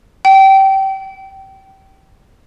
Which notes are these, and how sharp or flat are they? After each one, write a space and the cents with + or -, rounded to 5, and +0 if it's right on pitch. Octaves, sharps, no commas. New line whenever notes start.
G5 -20